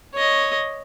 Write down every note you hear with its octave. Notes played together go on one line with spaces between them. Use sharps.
C#5 D#5